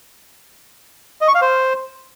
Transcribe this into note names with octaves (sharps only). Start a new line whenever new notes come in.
D#5
C#6
F5
C5